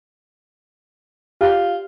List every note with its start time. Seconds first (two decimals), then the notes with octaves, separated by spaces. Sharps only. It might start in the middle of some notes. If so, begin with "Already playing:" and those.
1.41 F4 G4